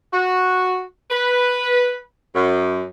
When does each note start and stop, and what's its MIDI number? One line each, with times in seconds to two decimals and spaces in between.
0.13 0.80 66
1.10 1.97 71
2.34 2.82 42